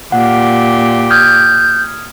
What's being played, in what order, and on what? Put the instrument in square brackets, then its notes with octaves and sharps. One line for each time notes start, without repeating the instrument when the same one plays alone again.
[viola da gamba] A#2 G4 [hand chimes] F#5
[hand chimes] D#6 F6 G#6 [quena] G6